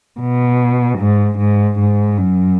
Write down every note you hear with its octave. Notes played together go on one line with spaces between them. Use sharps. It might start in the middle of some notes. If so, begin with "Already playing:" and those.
B2
G#2
G#2
G#2
F#2